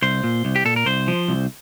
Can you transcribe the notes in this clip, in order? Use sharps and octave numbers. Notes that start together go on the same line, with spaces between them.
C2 C5
A#2
C2
G4
A#2 A4
A#4
C2 C5
F3
C2